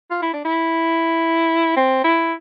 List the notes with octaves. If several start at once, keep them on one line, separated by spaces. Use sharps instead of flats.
F4
E4
D4
E4
C4
E4